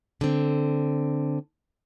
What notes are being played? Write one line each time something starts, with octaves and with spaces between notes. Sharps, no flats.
D3 C4